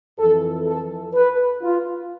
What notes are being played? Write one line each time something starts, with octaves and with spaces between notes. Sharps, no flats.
F2 E3 A4
A4
B4
F4